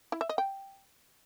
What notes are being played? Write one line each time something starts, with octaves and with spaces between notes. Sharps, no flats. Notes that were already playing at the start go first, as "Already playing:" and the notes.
E4
E5
D#5
G5